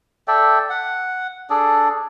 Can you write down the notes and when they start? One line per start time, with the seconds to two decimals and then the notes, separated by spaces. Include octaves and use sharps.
0.28 A4 D5 E5 G5
0.69 F#5
1.50 D4 G#4 A4 D5